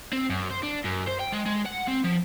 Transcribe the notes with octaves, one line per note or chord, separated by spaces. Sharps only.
C4
F#2
C5
D4
F#2
C5
G5
G#3
G#3
F#5
C4
F3